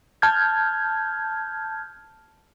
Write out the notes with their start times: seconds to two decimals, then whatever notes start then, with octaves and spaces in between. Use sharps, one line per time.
0.22 A5 F6 G6 G#6